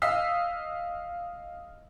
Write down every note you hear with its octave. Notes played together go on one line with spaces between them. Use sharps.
D#5 F5 D#6 E6 B6